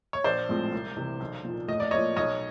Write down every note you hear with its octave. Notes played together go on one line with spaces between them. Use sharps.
C#5
A#1 C5 D5
A2 F3 G#3 C4
C2
C3 E3
B1
A#2 F3
A2 D#5
D5
F3 A#3 C#5 D#5
B1 C#5 D#5